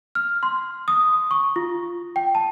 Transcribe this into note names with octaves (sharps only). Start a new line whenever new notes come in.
F6
C6
D#6
C#6
F4
G5
A5